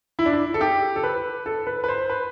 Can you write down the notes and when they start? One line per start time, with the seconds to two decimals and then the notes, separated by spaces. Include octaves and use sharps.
0.19 E4
0.26 D4
0.33 E4
0.54 A4
0.61 G4
0.96 A4
1.03 B4
1.46 A4
1.67 B4
1.84 B4
1.88 C5
2.10 B4